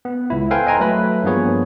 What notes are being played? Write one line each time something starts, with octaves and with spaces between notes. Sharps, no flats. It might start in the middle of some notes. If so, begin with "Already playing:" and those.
B3
C#2 E4
A4 B4 C5 F5 G5 G#5
D#5 G5 G#5 A#5 C6
F#3 A3 B4 B5
G2 F3 A#3 B3 G#4 C#5